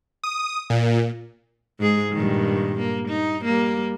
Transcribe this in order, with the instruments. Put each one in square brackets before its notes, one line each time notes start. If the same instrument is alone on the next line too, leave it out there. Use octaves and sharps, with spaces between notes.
[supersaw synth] D#6
A#2
[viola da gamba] G#2 G#3 G#4
G2 A#2 D#3
A#3
D#4
G3 A#3